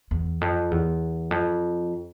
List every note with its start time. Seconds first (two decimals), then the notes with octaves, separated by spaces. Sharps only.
0.11 E2
0.41 F2
0.71 E2
1.31 F2